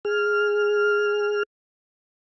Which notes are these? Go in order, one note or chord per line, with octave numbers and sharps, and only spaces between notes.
G#4 F6